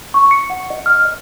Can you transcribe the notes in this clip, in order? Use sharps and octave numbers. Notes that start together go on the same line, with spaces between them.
C#6
C#7
F#5
D#5
F6
D#5